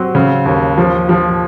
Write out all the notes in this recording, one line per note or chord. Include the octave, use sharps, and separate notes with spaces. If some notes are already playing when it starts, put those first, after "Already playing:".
Already playing: F#3 C4
C#3
D#2
F3
F3